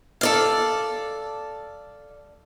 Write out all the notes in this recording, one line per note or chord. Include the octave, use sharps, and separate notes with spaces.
A4 D5 F5